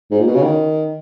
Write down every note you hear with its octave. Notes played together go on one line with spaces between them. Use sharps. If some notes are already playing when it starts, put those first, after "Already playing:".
G#2
A#2
B2
C#3
D#3